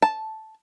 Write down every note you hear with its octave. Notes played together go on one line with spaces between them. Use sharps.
A5